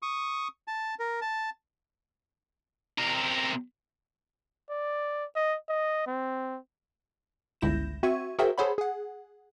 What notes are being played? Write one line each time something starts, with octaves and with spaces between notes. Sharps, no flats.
C#6 D#6
A5
A#4
A5
C3 A#4
D5
D#5
D#5
C4
G1 C#2 E4 G6 A#6 E7
C4 F#4 E5 C#6 G#6 D#7
F#4 G#4 A#4 C5 E5 G5
G#4 A4 C5 C#5 F#5 B5
G#4 F#5